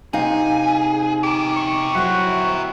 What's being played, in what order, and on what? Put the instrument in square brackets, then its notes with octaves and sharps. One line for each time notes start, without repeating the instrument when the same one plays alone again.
[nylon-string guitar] C3 D#4 F5 [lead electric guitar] G#4
[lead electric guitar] G4 A#4 [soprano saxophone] D6
[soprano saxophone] C#6
[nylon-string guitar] F#3 C5 [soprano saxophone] E4 [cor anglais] F#4